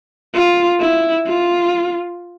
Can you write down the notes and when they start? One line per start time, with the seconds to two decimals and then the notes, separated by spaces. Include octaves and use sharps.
0.35 F4
0.80 E4
1.26 F4